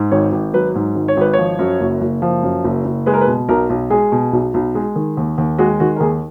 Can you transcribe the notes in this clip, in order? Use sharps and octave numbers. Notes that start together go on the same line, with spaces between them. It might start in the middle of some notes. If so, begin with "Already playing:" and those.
Already playing: G#2
G#1 C#5
G#1
F#3 B4
G#2
G#1
C#5
G#1 B4
C#5
F3
F#2
F#1
F#1
F3
F#2
F#1
F#1
G#3 B4
A#4
B4
B2
B1 A#4
B1
G#3 G#4
B2
B1
B1
G#3
D#3
D#2
D#2
G#3 F#4
D#3 F#4
A#4
D#2 G#4